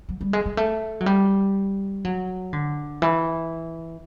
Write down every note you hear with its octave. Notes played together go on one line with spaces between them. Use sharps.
F#3
G3
G#3
G#3
A3
F#3
G3
F#3
D3
E3